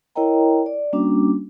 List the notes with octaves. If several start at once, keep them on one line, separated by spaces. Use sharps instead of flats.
E4 A#4 C#5 D#5 G5 A#5
D5
G3 A#3 C#4 D4 F#4 D6